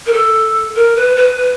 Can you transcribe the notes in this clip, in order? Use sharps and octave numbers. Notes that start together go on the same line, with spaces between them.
A#4
A4
A#4
B4
B4
B4